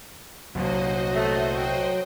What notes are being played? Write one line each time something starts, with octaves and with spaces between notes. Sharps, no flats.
C2 A#2 D3 F#3 F#4 C5 D#5
A3
G5